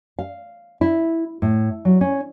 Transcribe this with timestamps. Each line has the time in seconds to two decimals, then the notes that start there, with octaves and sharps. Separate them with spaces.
0.19 F5
0.81 E4
1.42 A2
1.85 F#3
2.01 C#4